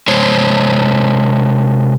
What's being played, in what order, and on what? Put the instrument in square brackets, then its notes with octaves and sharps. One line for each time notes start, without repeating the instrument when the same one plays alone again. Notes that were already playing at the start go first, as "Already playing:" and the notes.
[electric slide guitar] C3 G#3 C5 C#5